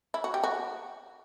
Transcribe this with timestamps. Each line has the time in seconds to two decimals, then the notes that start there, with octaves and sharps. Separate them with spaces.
0.14 E4
0.24 F#4
0.34 G4
0.44 F#4